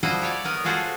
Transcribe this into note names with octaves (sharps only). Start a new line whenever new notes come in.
F3 G3 E4 F#4 C5 D#5
G4 C#5 D5
B3 A#4 D#5
G#3 F4 F#4 G#4 A4 C5